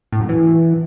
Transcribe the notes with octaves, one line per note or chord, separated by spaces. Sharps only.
A2
F#2
E3